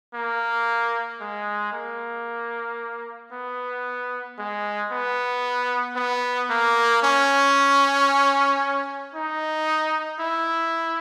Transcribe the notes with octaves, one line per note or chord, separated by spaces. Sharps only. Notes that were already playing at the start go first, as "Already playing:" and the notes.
A#3
G#3
A#3
B3
G#3
B3
B3
A#3
C#4
D#4
E4